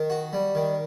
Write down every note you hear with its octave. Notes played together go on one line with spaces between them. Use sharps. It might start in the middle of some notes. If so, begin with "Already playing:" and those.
Already playing: D#3
F#4
G3
D#3